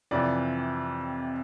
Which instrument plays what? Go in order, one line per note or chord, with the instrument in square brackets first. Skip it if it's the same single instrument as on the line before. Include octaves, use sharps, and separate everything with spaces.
[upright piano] F2 C3 E3 D5